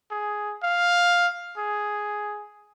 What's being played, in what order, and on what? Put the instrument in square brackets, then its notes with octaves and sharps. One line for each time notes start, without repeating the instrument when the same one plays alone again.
[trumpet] G#4
F5
G#4